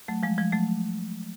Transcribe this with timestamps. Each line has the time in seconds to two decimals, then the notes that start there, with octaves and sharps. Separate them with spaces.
0.08 F#3 A3
0.23 F3 G#3
0.38 F3 G#3
0.52 F#3 A3